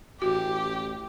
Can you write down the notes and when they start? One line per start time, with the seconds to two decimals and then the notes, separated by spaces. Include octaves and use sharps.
0.22 A1 F#4 G4